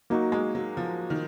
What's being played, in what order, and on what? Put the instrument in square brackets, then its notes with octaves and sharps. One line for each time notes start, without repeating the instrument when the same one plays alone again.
[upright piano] F#3 [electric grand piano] A#3 D#4 F#4
[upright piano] G#3
F#3
F3
D#3